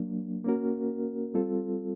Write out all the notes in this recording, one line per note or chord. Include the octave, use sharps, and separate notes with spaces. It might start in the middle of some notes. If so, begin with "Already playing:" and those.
Already playing: F#3 A#3 D4
A#3 C#4 F#4 A#4
G3 C4 F4 A4